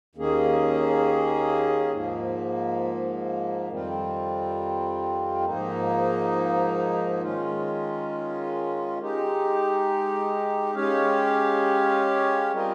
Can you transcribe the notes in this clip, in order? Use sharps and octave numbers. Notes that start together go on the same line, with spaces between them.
D#2 D#3 A#3 C#4 G#4
G#2 F3 A#3
F2 D#3 G3 C4 F4
G#2 F3 A#3 D#4
D#3 G#3 C#4 F4
G#3 D#4 G4
G#3 C#4 G4 C#5 F5
G3 C4 F4 A#4 D#5